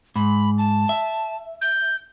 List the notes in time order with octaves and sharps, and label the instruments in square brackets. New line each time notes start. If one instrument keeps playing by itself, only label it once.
[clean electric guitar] G#2 [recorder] B5
[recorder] A5
[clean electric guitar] E5
[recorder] G6